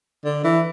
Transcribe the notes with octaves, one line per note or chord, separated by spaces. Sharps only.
D3
E3